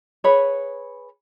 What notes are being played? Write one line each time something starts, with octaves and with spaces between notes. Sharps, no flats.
G#4 B4 C#5 B5